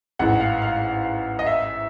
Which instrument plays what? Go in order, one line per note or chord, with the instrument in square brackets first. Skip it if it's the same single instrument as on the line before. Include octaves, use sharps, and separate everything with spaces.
[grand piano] A1 G#2 E3 [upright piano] F#5
[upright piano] F5
F5
D#5
E5